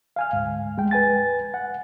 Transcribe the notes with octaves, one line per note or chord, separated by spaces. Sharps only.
F5 G#5 F6
D2 G#2
G#3 G5
B4 G#5 A6
F#5